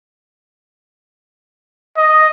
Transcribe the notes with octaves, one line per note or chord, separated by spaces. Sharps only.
D#5